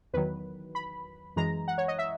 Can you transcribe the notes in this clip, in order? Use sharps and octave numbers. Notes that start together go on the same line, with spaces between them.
E2 D#3 F#3 B4
B5
F#2 E3 G#3 A#5
F#5
C#5
D#5
E5